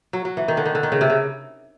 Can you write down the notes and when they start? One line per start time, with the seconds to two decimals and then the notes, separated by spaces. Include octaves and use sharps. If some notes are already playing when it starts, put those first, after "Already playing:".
0.13 F#3
0.25 F#3
0.37 E3
0.48 D#3
0.57 D3
0.66 D#3
0.75 D3
0.83 D#3
0.92 C#3
1.01 C3
1.10 C#3